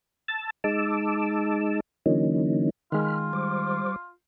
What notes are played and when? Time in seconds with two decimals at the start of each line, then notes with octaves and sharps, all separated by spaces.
0.28 A5 E6 A6
0.64 G#3 D#4 A5 D6 E6
2.06 D3 E3 F#3 A#3 C#4 D#4
2.92 D#3 G#3 F4 B5 F6
3.33 G3 C5 D6